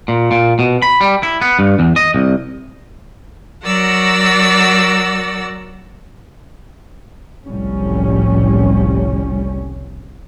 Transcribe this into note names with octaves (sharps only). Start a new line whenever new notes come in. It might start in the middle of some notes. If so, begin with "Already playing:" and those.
A#2
A#2
B2
B5
G3
E4
B3
G2
E2
D#5
C2
F#3 F#4 A#4 D5 F#5 E6
F#1 C2 A2 F3 G3 C#4